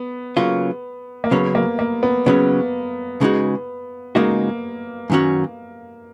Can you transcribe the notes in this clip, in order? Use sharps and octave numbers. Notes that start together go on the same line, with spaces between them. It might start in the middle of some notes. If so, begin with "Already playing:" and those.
Already playing: B3
C#3 F#3 A#3 C#4 F4
A#3
C#3 F#3 B3 C#4
A#3
A#3
B3
C#3 F#3 B3 C#4
C#3 G#3 D#4 F#4
C#3 G#3 A#3 D#4 F#4
F#2 D#3 F#3 C#4 F#4